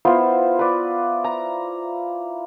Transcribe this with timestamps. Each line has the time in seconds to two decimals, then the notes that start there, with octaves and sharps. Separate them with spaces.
0.05 B3 E4 F4 C5
0.59 B4 D5
1.24 A#5